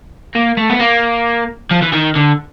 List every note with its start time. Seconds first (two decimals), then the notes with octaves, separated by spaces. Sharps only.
0.35 A#3
0.57 A3
0.70 B3
0.80 A#3
1.71 F3
1.82 E3
1.93 D#3
2.16 D3